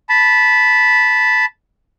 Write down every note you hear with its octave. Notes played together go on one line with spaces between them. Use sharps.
A5 B5